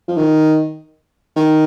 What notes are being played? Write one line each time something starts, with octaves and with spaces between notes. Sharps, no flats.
F3
D#3
D#3